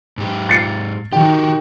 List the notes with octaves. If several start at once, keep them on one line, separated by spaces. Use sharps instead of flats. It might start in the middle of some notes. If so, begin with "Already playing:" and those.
G#2 G4
A6 C7 C#7
D#3 F#4 G4 G5